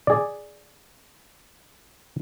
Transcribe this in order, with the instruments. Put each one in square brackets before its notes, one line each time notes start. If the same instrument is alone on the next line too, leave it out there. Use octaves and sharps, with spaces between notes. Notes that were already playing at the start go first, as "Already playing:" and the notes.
[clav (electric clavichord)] G#4 D5